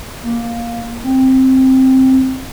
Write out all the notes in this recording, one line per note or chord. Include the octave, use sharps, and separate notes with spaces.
A#3
C4